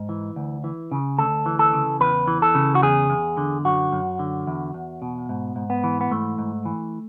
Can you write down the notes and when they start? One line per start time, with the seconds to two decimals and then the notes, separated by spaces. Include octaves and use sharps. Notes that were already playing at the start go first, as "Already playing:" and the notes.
Already playing: G#2
0.09 E3
0.36 D2
0.64 E3
0.92 C#3
1.18 D2 A4
1.46 E3
1.59 A4
1.73 C#3
2.00 E2 B4
2.27 E3
2.42 A4
2.55 C#3
2.75 F#4
2.82 E2 G#4
3.10 E2
3.38 D3
3.65 F#2 F#4
3.92 F#2
4.19 D3
4.47 E2
4.74 E2
5.02 B2
5.29 G#2
5.56 G#2
5.70 B3
5.84 E3
6.01 B3
6.11 G#2 A3
6.38 G#2
6.65 E3